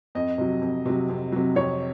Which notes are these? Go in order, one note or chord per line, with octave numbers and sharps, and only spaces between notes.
F2 D#5
C3 F#3
F2
C3 F#3
F2
C3 F#3
F2 C#5